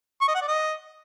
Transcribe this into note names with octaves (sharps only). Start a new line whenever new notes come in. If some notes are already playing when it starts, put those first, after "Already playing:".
C#6
D#5
F#5
D5
D#5